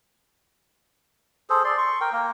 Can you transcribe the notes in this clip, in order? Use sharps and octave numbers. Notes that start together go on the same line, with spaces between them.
G#4 A4 C5
D5 C6
C6 C#6
A#4 G5
A#3 A#4